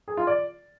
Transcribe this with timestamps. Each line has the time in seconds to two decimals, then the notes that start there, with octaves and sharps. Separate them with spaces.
0.08 G#4
0.17 F4
0.27 D5